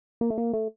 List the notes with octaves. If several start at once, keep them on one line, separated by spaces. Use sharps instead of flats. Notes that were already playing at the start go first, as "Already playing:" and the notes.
A#3
A3
A#3
A3